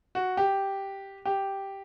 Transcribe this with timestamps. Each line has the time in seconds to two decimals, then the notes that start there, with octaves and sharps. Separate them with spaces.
0.15 F#4
0.37 G4
1.25 G4